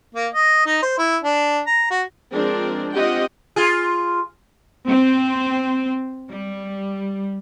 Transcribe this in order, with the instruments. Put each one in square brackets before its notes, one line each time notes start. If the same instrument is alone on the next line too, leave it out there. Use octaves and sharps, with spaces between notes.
[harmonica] A#3
D#5
D#4
C5
E4
D4
A#5
F#4
[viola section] F3 G#3 C4 D4 G#4 A#4
C4 F4 G4 D#5 F#5 G5
[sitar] F4 G#4
[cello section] C4
G3